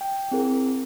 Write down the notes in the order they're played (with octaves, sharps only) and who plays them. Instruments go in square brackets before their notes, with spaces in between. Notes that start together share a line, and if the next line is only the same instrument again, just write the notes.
[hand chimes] G5
C4 E4 G#4 A#4